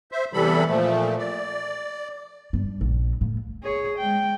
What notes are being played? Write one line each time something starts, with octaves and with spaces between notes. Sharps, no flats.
C5 E5
E2 C3 E3 G3 A4 B5
A#2 F3 A3
D5
G2
A#1
A2
G#4 C#5
G#3 G5